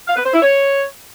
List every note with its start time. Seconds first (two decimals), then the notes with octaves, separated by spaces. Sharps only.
0.08 F5
0.16 B4
0.25 C5
0.34 E4
0.43 C#5